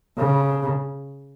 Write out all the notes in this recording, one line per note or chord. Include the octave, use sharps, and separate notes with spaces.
C#3